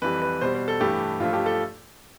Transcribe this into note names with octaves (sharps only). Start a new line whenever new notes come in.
F2 E3 G3 B4
B4
B2 G3 C5
C5
A4
G2 E3 A3 G4
G2 F3 A3 F4
G4
A4